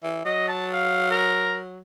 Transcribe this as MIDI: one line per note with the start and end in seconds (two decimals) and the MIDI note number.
0.04 0.25 52
0.25 1.80 54
0.25 0.48 75
0.48 0.67 81
0.73 1.08 77
1.11 1.56 70